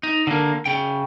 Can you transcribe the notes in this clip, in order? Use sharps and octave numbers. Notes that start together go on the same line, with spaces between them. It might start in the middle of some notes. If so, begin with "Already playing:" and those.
D#4
D3 A#3
C#3 G5